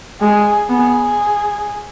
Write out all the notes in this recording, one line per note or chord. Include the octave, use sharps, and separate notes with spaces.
G#3 G#4
B3 G#4